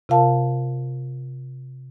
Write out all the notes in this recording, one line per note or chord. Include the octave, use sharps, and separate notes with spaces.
C3 F4 A#4 F5 A5